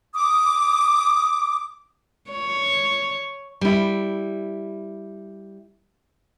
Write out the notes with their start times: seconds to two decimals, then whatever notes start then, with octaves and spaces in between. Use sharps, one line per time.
0.15 D6 D#6
2.31 C#5
3.61 G3 E4